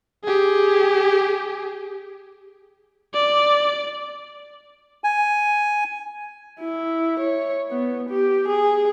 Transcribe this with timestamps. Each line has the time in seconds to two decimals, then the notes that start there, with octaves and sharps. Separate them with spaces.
0.24 G4 G#4
3.14 D5
5.04 G#5
6.60 E4
7.20 C#5
7.71 B3
8.09 G4
8.48 G#4